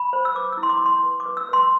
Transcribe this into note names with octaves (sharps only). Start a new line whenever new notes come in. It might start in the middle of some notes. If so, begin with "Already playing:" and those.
Already playing: B5
C5
E6
B4 D6
E4 E6
C6
D6
E4 C6
B4
D6
B4
E6
B4 C6